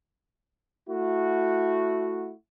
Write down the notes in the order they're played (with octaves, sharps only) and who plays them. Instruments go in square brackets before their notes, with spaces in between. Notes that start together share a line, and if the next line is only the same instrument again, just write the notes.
[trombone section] A3 E4 F#4